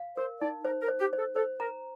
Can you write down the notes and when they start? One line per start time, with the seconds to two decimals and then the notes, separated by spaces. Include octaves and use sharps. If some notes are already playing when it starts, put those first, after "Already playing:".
Already playing: F5
0.17 A#4 C5
0.41 D#4 D5
0.64 A#4 C5
0.82 A#4
0.88 C5
1.00 G4
1.13 C5
1.18 A4
1.36 A4 C5
1.60 A#4 A#5